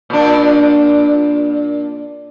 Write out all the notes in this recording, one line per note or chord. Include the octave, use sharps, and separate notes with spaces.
A#2 D4